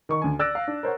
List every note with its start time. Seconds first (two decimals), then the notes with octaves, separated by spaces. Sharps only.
0.09 D#3 C#6
0.22 D2 G#5
0.39 D5 E6 F#6 A6 A#6 D7
0.55 F5
0.67 D4
0.83 A#4 C5 C#5 F#5